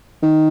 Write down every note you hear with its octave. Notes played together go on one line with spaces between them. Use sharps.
D#3